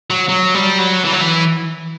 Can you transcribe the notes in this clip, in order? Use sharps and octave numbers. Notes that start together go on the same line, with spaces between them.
F#3
F#3
G3
F#3
E3
F#3
E3